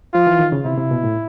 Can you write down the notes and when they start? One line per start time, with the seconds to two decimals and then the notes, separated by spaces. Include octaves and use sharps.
0.14 F3 F4
0.27 E3
0.39 D#3
0.52 C#3
0.65 C3 E4
0.78 C3
0.91 B2
1.04 A2